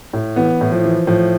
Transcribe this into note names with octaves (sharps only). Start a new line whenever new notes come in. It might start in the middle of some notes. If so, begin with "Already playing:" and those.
A2
E3 B3
A2
F3
E3
A2 F3